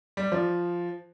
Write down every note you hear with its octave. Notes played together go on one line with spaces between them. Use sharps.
G3
F3